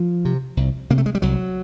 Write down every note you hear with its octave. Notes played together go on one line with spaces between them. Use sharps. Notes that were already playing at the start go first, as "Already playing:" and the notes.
Already playing: F3
C3
C2
C3 A#3
A3
G#3
G3
C2 F#3